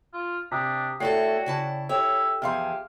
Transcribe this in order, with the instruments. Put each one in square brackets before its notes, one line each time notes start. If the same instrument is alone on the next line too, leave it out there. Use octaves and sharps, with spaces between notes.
[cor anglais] F4
[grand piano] C3 [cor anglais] D4 [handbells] D#6 B6
[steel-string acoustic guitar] A3 E4 A4 [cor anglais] F#4 [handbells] C#5 D5 G5 [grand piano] C7
[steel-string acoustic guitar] C#3 E4 A5
[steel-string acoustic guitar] E4 C#5 [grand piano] G4 [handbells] A4 [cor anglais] E5
[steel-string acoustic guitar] E2 F3 G#4 [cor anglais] G4 [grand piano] E5 F5 C6 [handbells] F6